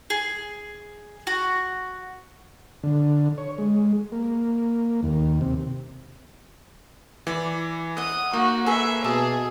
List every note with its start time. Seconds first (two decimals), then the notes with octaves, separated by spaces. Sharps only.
0.10 G#4
1.27 F#4
2.83 D3
3.38 C#5
3.58 G#3
4.12 A#3
5.03 D#2
5.41 C3
7.27 E3 D5 B5
7.97 D#5 E5 F#5 D#6
8.33 A#3 D#4 F#4
8.66 G#4 A4 B4 E5
9.04 B2 G#4 E5 A5 D6